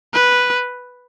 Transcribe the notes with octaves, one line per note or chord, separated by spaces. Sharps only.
B4